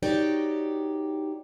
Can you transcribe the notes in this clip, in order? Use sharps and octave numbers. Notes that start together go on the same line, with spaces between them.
D#4 F#4 G4 C#5 D5